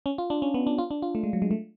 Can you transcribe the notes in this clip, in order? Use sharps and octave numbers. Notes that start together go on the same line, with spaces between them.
C#4
F4
D4
C#4
B3
D4
F4
D4
F4
A3
G#3
F#3
G#3
A3